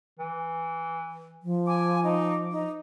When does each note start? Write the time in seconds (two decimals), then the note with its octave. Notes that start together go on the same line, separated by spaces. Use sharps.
0.19 E3
1.43 F3
1.67 G#5 D6
2.04 D#4
2.51 D#4